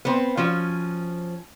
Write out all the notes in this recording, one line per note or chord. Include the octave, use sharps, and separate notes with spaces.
B3 C4
F3 C#4 F#4